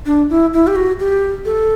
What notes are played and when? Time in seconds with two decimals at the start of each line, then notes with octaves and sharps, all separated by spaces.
0.06 D4
0.30 E4
0.53 E4
0.67 G4
0.76 F#4
0.99 G4
1.45 A4